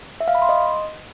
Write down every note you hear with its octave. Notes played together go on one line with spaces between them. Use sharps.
E5
F5
B5
C6
D#5